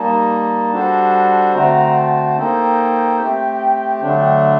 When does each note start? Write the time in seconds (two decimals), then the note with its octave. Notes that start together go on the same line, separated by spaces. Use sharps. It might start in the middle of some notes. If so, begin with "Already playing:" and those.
Already playing: G3 A#3 D#4 A5
0.71 G3 D4 F#4 A4 C5
1.54 D3 A3 C4 F#4 C5 A#5
1.95 A5
2.37 A#3 D#4 A4 C5 G5
3.19 A3 C4 G4
4.01 D3 F#3 A3 D4